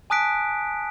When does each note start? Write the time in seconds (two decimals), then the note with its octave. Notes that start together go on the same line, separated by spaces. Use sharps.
0.10 G#5 A5 D#6 F#6 B6 D7